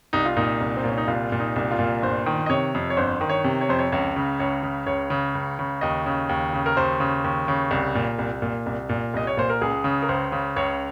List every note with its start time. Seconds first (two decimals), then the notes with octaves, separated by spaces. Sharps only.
0.13 C2 D#4
0.25 F4
0.36 A#2 D#4
0.61 C2
0.77 C4
0.84 A#2 C#4
0.98 D#4
1.08 C2 F4
1.32 A#2
1.40 D#4
1.56 C2
1.71 F4
1.79 A#2
2.02 G1 C5
2.26 D#3
2.46 D#5
2.50 C3 C#5
2.74 F2
2.90 C#5
2.97 G1 C5
3.21 D#3
3.29 C#5
3.44 C3
3.61 C#5
3.69 F2 C5
3.79 C#5
3.92 C#2 C#5
4.16 C#3
4.39 C#2 C#5
4.63 C#3
4.87 C#2 C#5
5.10 C#3
5.35 C#2
5.59 C#3
5.81 D#2 D#5
6.06 C#3
6.29 D#2
6.53 C#3
6.66 A#4
6.77 D#2 C5
7.00 C#3
7.24 D#2
7.48 C#3
7.71 C2
7.95 A#2
8.19 C2
8.42 A#2
8.66 C2
8.89 A#2
9.14 C2 D#5
9.27 C#5
9.37 A#2 C5
9.50 A#4
9.61 C#2 G#4
9.84 C#3
10.03 A#4
10.09 C#2 C5
10.32 C#3
10.56 C#2 C#5